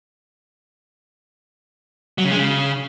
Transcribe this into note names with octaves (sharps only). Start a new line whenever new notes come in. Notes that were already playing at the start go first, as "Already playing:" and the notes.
F#3
C#3
G#3
C#3